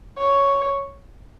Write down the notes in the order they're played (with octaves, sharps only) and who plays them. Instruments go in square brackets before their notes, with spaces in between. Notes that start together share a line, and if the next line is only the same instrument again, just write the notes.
[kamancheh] C#5